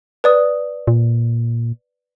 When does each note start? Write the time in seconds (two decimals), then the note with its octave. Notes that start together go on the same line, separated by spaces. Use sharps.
0.24 B4 D5 D#6
0.87 A#2